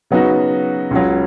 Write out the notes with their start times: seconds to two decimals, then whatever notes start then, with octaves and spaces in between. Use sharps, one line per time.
0.11 C#3 F#3 B3 D#4 F#4
0.91 C#2 C#3 F#3